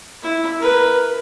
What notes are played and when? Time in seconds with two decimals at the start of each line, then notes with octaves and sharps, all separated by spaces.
0.23 E4
0.59 A#4 B4